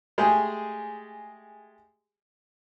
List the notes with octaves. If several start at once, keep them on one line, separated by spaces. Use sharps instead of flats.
G#3 A3 G4 G#4